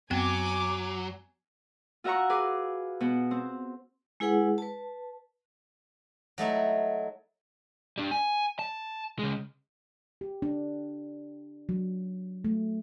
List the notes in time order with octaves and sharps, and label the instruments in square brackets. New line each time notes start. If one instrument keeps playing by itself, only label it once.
[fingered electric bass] F#2 [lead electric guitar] F#3 [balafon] B3 C4 G5 [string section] G#5 D6
[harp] F4 F#4 E5 F#5 A#5 C#6
G#4 B4 D6
B2 B3
C4 C5
[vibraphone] G#3 E4 G#4 B4 F#5
B4 A5
[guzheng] F#3 A3 D#4 E4
[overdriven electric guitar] G3 D4
G#5
A5
C#3 G#3
[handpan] G4
D4
F#3
A3